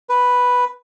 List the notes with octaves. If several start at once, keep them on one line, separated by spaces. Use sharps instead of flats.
B4